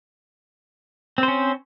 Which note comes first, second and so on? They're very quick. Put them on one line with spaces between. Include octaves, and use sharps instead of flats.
C4 C5 C#4